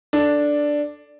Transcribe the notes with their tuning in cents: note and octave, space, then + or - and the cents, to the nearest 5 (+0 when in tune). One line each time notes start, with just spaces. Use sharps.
D4 +0 A4 +0